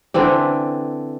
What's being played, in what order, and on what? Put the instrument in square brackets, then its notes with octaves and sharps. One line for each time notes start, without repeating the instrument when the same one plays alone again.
[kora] D3 E3 C4 D4